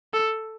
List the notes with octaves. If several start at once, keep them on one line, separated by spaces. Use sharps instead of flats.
A4